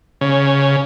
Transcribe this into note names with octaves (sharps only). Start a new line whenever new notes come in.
C#3